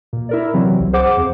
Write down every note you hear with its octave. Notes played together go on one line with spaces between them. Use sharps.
A#2
E4 A#4 D5
C3 E3 F#3 C4
C2
G#4 C5 F#5 D6
F2